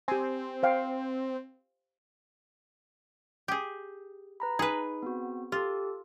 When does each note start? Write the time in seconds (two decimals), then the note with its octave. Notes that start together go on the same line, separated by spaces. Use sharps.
0.08 C4 G4 G#5
0.63 C5 F5 G5
3.48 G4 G#4
4.40 B4 A#5 B5
4.59 D#4 G#4 B4
5.03 B3 C4 F#4
5.52 F4 G4 A4